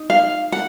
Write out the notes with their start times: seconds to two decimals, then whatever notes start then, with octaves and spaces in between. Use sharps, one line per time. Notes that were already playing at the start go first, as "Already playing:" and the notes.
Already playing: D#4
0.10 F5
0.52 F#5